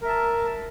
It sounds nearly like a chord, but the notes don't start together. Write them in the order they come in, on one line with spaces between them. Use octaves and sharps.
A#4 E5 A5